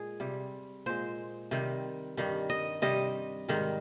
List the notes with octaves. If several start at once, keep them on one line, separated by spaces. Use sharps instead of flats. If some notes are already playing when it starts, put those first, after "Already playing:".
Already playing: A#2 G#3 G#4
C3 G3
A#2 G#3 C5
C3 D#3 G3
G2 D#3 G3
D#5
C3 G3 D#5
G#2 D#3 G3